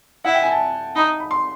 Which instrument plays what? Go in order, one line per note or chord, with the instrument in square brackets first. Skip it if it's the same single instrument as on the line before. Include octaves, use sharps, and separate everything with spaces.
[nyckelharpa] E4 [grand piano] F#5
[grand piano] G5
G#5
A5
[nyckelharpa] D#4 [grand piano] B5
[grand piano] B5
C6